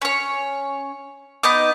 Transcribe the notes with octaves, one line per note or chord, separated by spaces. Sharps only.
C#4 C#5
B3 D#4 D#5 D6